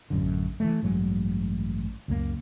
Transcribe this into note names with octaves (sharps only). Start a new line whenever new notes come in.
A1 F#2 D3
E3 F#3 A3
A1 G2 F#3 G#3
C#2 F#2 F#3 A#3